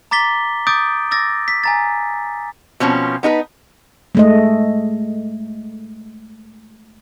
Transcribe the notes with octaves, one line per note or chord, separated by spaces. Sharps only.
A#5 D6 A6 B6 G7
D6 D#6 G6 A6 D7
D6 E6 A6 A#6
B6
G#5 A#5 A6
B2 F3 C4 C#4
B3 D#4 A#4 B4
G#3 A3 D#5